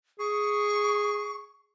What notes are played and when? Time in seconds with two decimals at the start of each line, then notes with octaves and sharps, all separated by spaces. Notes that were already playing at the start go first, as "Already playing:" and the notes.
0.19 G#4 C#6